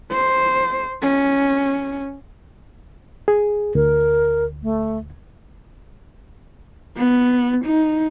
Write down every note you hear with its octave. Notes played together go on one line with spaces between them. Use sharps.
C5
C#4
G#4
D2 A#4
A3
B3
D#4